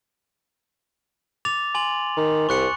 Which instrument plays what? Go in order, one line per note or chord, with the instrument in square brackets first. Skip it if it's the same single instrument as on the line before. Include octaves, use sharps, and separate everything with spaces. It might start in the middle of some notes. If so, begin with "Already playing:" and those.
[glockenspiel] D6 A6 F7
G#5 C6 F#7
[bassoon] D#3
[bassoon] C2 [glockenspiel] C#6 F#6 C#7